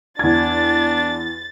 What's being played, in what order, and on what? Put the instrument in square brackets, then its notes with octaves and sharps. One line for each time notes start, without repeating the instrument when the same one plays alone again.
[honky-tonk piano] E2 G#6 [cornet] D4 [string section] A6